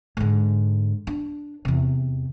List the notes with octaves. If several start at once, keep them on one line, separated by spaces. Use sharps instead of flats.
G#2 D3
D4
E2 C3